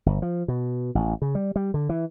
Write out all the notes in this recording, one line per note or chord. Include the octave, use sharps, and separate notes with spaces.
G1
F3
B2
A1
C#3
G3
G3
D3
E3